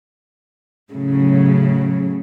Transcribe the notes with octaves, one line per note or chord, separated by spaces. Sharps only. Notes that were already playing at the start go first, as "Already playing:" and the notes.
A2 C#3 F#3